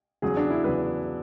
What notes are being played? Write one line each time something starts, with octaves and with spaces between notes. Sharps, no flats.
E2 C#3 F#3 G#4
D4
E4
E2 C#3 F#3 B4